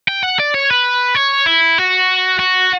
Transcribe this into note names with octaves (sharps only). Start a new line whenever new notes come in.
G5
F#5
D5
C#5
B4
C#5
E4
F#4
F#4